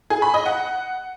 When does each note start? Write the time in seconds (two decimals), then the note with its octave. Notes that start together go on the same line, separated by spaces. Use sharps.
0.10 G#4
0.22 B5
0.34 D#5
0.46 F#5